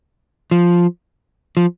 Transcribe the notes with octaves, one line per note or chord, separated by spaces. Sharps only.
F3
F3